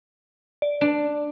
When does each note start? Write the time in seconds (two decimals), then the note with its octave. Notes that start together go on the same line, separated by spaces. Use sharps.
0.62 D5
0.81 D4